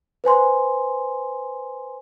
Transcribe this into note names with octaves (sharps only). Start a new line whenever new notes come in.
B4 C5 G#5 C6